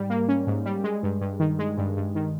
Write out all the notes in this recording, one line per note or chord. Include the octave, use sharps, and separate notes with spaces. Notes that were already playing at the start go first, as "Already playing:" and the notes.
Already playing: G#2 G3
A#3
C#4
G#2
G3
G#3
G2
G2
D#3
G#3
G2
G2
D#3